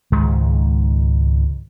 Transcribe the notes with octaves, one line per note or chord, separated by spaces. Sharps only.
C#2 G#2 D#3 G#3